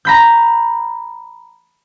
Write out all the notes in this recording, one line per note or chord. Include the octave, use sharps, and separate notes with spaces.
A#5 B5 G6